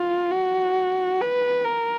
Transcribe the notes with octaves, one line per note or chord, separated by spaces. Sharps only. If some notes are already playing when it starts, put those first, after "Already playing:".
Already playing: F4
F#4
B4
A#4